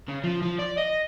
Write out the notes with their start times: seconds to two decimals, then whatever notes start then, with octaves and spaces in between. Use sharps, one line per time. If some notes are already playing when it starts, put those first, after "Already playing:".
0.08 C#3
0.24 F3
0.42 F3
0.59 D5
0.78 D#5